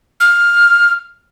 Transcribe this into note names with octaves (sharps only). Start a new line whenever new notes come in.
F6